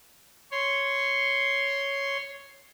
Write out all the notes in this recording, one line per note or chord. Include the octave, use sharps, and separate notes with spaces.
C#5 C6